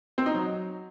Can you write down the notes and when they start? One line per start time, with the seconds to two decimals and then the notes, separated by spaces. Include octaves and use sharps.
0.18 C4
0.26 D#4
0.34 F#3